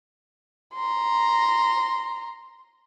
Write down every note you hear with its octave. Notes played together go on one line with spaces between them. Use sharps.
A#5 C6